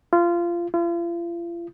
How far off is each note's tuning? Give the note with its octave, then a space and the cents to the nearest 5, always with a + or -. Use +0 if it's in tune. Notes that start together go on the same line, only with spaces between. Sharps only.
F4 -20
F4 -40